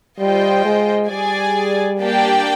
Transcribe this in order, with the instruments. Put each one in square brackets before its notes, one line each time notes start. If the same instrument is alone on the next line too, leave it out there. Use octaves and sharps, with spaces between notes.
[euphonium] G3 [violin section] F4 C5 D#5 G5
[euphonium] G#3
[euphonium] G3 [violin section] G#4 D5 G#5
[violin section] A#3 D4 G4 D5 G5